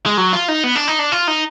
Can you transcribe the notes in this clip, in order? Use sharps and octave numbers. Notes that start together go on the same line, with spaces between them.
G#3
F#3
F4
D#4
B3
D4
D#4
D4
F4
D#4